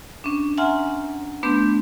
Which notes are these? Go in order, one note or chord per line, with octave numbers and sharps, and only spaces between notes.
C#4 D4
E5 F#5 G#5 A#5 C6 F6
A3 B3 D4 B4 C6 G6